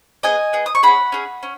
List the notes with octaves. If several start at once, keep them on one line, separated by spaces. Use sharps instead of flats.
B3 G#4 D#5 G#5
B3 G#4
D#6
C#6
C#4 G#4 F#5 B5
C#4 G#4
C#4